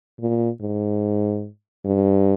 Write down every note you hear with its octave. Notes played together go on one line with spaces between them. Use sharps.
A#2
G#2
G2